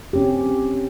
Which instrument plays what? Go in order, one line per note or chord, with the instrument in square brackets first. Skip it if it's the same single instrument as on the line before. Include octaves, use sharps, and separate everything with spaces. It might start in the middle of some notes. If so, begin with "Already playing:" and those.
[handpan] C4 C#4 G4